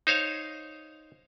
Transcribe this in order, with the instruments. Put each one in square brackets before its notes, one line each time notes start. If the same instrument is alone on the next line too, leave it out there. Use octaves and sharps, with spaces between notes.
[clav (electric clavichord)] D#4 C5 C#5 F5